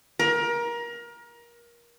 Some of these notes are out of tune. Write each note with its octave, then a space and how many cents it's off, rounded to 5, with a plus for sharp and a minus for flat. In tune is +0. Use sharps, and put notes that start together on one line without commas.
A#4 +25